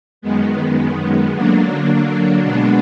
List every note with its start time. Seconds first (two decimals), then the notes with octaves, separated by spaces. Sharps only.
0.22 F#2 D#3 G#3 B3
1.32 D3 F#3 A#3 D4
2.42 B2 G#3 B3 D4